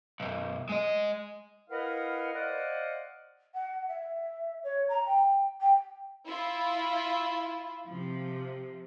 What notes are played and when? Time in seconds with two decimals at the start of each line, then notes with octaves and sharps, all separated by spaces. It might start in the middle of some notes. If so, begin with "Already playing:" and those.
0.20 B1 F#2
0.69 G#3 D#5
1.70 E4 A#4 B4 D#5 F5 F#5
2.34 C5 D5 D#5 F5 F#5
3.54 F#5
3.87 E5
4.63 C#5
4.88 A#5
5.06 G5
5.60 G5
6.26 E4 F4
7.86 C3 F3